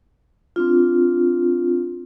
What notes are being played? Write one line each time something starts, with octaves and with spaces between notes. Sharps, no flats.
C4 D4 F4